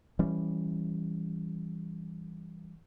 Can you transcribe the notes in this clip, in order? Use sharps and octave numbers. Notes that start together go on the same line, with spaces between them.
E3 G3 C#4